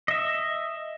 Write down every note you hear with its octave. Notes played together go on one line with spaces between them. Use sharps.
D#5 E5